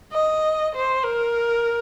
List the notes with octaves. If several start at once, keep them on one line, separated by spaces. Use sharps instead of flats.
D#5
C5
A#4